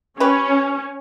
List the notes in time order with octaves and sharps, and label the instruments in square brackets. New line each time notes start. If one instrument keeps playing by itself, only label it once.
[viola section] C#4 [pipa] G4 B4